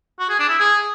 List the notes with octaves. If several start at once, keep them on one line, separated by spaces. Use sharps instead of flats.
F#4
G#4
D4
E4
G#4